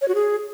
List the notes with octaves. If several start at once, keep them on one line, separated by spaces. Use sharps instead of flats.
C#5
F#4
G#4